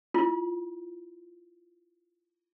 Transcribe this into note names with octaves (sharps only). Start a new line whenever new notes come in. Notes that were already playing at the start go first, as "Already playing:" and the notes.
E4 F4